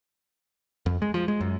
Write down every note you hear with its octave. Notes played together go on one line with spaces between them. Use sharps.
F2
G#3
F3
G#3
F#2